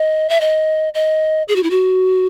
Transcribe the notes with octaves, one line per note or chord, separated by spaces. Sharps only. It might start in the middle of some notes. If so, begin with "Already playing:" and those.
Already playing: D#5
E5
D#5
D#5
G#4
F#4
E4
F#4